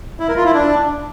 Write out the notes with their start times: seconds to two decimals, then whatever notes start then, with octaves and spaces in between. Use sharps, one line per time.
0.20 E4
0.28 A#4
0.37 F4
0.46 E4
0.54 D4